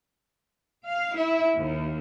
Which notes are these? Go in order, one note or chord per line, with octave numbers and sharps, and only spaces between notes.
F5
E4
D#2